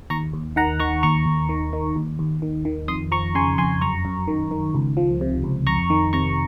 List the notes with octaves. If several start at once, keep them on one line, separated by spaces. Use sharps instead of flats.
D#2 A#5 C#6
D#2
D#3 F#5 A#5
D#3 A#5 C#6
D#2 A#5 C#6
D#2
D#3
D#3
D#2
D#2
D#3
D#3
F2 C6 D#6
F3 A#5 C#6
C#3 G#5 C6
F2 G#5 C6
F#2 A#5 C#6
F#2
D#3
D#3
C#2
F3
C3
C#2
F2 A#5 C#6
D#3
C3 A#5 C#6